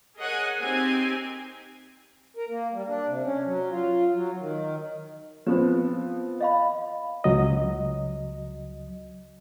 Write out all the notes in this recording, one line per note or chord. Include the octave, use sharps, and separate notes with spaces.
G#4 A#4 C#5 D#5 F#5 G#5
C4 D#4 G4 G#5
A#4
A#3
G3
D4
C3
C#4
F#3
F4
F#3
D#3
F3 B3 C4 B4 C5
D#5 F5 B5
C#2 F#3 D#5